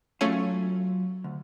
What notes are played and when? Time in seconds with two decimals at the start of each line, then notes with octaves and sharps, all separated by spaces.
0.21 F#3 A3 C#4 F4
1.24 D2